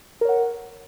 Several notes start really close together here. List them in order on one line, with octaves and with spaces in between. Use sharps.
A#4 C#5 F#5